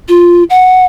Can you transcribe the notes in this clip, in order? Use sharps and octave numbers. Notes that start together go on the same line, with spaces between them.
F4
F#5